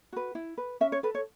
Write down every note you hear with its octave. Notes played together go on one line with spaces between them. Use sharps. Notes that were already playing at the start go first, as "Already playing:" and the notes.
F#4 B4
E4
B4
C#4 E5
C#5
A4 B4
C#5